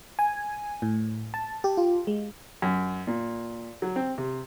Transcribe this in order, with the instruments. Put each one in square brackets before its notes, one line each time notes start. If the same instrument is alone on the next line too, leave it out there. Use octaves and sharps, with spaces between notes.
[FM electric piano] G#5
A2
A5
G4
F4
G#3
[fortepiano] F#2
A#2
F#3
C4
C3